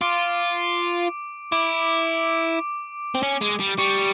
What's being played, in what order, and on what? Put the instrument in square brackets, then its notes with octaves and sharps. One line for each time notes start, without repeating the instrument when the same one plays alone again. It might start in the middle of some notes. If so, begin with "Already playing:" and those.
[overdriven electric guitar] F4 [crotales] D6 D7
[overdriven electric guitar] E4 [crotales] D6 D7
[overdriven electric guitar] C4
C#4
G#3
G3
[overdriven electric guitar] G3 [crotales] C#6 C#7